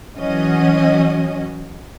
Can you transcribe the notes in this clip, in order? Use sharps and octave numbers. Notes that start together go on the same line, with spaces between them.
E3 F#3 C#4 F#4 D#5